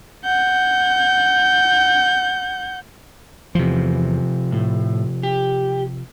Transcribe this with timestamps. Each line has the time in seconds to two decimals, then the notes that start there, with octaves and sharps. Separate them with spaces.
0.25 F#5 G6
3.55 E2 C3 F3
4.52 A2
5.23 G4